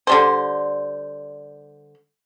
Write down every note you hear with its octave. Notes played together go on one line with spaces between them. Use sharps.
D3 G3 C5